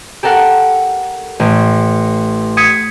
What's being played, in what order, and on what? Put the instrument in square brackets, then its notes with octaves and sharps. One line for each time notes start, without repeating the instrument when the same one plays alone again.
[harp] G4 A4 A#4 F#5
A1
D#6 G#6 B6 C#7